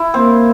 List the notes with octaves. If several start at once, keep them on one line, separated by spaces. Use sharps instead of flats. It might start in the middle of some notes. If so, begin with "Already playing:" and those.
Already playing: E4
A#3 C4